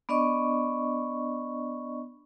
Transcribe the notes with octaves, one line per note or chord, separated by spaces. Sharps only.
B3 D4 D5 D#5 C#6